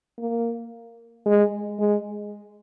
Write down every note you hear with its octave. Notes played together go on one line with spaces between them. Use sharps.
A#3
G#3
G#3